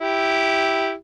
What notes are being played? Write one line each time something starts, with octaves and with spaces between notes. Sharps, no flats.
E4 G4